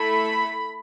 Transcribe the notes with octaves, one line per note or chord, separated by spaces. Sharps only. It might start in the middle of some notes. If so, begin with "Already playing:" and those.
Already playing: A3 E4 A4 B5